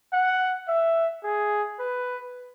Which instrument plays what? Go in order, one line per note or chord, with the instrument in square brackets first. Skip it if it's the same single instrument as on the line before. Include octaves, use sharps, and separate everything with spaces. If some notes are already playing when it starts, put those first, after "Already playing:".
[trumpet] F#5
E5
G#4
B4